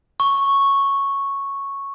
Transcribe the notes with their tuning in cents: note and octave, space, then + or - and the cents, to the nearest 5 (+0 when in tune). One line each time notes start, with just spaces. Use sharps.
C#6 -5